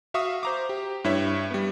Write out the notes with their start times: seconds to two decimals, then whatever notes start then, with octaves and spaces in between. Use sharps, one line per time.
0.14 F#4 E5 F5 C#6 D#6
0.43 C5 A#5 D6
0.69 G4
1.04 G2 E4 C#5 E5 B6
1.51 G3 B3